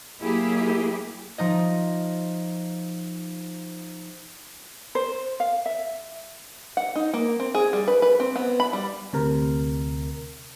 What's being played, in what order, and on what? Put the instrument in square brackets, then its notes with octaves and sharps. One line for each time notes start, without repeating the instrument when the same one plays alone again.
[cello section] F#3 A#3 E4 G4 G#4
[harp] F3 D#4 D#5
[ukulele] C5
F5
E5
[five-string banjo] F#5
D#4
A#3
C4
G#4
G3
B4
B4
C4
B3
B5
G3
[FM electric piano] D2 C3 A#4